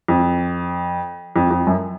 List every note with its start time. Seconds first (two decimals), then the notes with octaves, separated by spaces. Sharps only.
0.08 F2
1.36 F2
1.51 F2
1.67 F#2